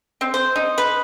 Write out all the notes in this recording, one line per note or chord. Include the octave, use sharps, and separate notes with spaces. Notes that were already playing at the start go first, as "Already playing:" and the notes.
C4
C5
D#4
B4